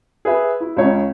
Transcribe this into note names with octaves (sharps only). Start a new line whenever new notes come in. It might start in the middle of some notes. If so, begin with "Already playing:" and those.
G#4 B4 E5
E4
C#2 C#3 C#5